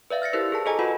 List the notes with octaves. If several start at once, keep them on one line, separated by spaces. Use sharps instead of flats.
B4 D5 E5 F5
F6 A6 A#6 C#7
E4 G4 A#4 C5 E6
G#4 A#4 A5
G#4 A4 D#5 G#5 A#5
F4 F#4 B4 F#5 B5